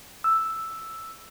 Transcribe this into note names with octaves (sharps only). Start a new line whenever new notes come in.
E6